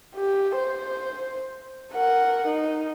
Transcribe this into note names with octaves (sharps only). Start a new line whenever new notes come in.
G4
C5
A#4 F#5
D#4